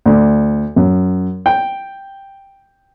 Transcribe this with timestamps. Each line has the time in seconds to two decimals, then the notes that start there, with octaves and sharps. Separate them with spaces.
0.06 D2
0.76 F#2
1.46 G5